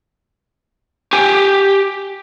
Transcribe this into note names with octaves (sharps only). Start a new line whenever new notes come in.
G4 G#5